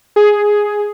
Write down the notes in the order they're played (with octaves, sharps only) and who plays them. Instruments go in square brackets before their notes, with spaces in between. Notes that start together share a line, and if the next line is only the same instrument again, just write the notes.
[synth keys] G#4